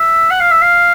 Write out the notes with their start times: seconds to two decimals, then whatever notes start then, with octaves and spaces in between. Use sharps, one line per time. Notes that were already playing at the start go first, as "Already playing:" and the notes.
Already playing: E5
0.30 F#5
0.41 F5
0.51 E5
0.62 F5